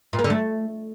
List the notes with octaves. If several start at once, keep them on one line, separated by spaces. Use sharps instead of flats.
A#2
A#3
D3
A3